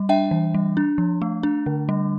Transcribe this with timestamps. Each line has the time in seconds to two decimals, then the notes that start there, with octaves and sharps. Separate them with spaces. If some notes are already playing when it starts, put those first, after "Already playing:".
Already playing: G3
0.09 D4 E5 G5
0.31 E3
0.54 G3
0.77 D4
0.98 F3
1.22 A3
1.43 D4
1.66 D3
1.89 G3